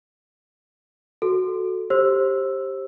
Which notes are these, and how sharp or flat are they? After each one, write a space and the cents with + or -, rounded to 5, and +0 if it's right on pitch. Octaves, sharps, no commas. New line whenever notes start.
F#4 +0 A4 -5
G4 +0 C5 +30 E6 +0